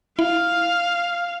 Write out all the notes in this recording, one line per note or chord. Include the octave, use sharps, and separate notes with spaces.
E4 F5